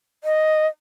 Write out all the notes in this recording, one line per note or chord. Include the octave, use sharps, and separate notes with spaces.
D#5